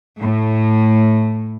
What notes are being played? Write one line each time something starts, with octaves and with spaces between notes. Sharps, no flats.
A2